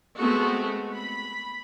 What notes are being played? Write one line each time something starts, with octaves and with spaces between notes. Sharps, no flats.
G#3 A3 B3 C4 F#4
B5